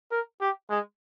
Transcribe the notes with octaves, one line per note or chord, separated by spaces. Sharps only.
A#4
G4
G#3